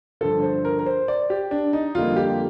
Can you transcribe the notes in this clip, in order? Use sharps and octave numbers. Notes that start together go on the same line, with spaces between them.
G2 D3 F3 A4
C5
A#4
A#4
C5
D5
G4
D4
D#4
F2 D3 G3 A#3 F4
G4